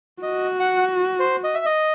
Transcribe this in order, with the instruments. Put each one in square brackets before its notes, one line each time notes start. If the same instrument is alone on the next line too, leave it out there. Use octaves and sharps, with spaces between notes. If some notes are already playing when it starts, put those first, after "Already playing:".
[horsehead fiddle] F#4 [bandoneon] D#5
[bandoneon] F#5
C5
D#5
E5
D#5